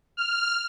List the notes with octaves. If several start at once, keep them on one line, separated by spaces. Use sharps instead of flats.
F6